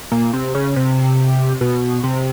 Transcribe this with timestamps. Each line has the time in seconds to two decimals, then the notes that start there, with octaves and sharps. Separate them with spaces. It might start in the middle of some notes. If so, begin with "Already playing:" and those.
0.12 A#2
0.33 C3
0.55 C#3
0.76 C3
1.61 B2
2.04 C3